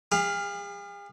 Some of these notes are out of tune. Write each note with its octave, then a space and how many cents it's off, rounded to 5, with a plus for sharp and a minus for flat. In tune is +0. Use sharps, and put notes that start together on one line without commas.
G#4 -45 F5 +0 B5 +0